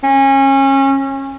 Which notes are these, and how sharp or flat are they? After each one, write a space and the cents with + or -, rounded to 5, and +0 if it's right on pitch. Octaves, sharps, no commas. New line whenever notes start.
C#4 -25